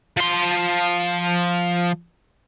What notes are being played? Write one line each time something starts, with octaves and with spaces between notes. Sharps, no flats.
F3 C6